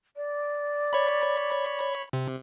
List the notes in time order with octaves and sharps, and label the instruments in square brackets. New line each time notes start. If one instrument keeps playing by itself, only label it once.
[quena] D5
[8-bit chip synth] C#5 B5
C3